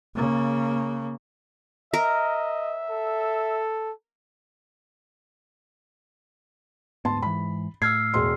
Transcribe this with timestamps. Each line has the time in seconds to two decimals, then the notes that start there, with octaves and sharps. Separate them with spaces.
0.15 C#3 A#3
1.94 A#4 D#5 E5
2.90 A4
7.05 D2 G#2 B3 A5 C6
7.23 G#2 E3 B5
7.82 A2 E6 F6 G#6 C7
8.14 E1 C6